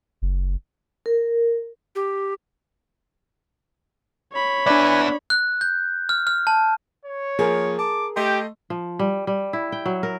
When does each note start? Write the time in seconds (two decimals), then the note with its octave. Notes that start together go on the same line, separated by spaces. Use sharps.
0.22 F#1
1.06 A#4
1.95 G4
4.32 C#5 B5
4.66 B3 D4 B4 D5 E5 G#5
5.30 F#6
5.61 G6
6.09 F6
6.27 F6
6.47 A5
7.05 C#5
7.39 F3 A#3 G#4 A#4
7.79 A5 D6
8.16 A3 G4 D#5 G5 C6
8.70 F3
8.99 G3
9.27 G3
9.53 E4
9.72 G5
9.86 F#3
10.03 A#4